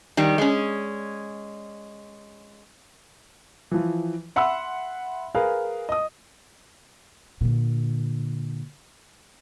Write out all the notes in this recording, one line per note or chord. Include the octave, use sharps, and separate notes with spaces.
D#3 G3
G#3 C#4
E3 F3
E5 F#5 B5 C6 E6
G#4 A#4 B4 F5
D#5 D#6
A#2 D3